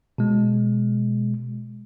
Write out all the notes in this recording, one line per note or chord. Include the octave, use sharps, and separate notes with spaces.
B2 G#3